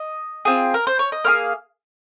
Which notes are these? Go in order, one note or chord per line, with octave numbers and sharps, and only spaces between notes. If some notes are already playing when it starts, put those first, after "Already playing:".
Already playing: D#5
C4 F4 G#4
A#4
C5
C#5
D#5
A#3 F4 G#4 F5